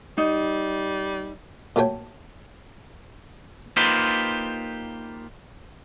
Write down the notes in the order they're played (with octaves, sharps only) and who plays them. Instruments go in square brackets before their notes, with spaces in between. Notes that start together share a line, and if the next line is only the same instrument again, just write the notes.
[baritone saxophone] G3 [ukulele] D#4
[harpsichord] A#2 F#3 A3 C#5 G5
[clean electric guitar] A#3 D#4 F4 G4 B4 C5